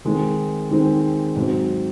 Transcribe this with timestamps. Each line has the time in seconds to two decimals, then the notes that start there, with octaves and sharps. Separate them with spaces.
0.05 D#3 G#3 C4 D#4
0.70 D#3 G#3 C4 D#4
1.36 G#2 F#3 C4